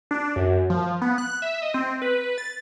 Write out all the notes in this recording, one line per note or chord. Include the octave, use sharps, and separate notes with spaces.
D4
F#2
F3
B3
F#6
E5
D#5
C4
B4
A6